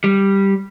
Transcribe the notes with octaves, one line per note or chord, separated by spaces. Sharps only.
G3